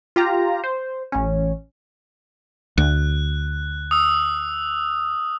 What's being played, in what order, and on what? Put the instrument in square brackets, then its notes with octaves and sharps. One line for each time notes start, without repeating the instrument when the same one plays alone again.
[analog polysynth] F4 G4 A#5
C5
A1 C#4
[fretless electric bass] D2 [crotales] F#6
[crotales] D#6 E6